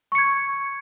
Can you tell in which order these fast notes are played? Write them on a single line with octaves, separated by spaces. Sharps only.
C#6 C#7 G#6